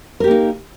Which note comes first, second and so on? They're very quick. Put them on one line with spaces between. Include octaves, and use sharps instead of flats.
A#4 G4 A#3 D#4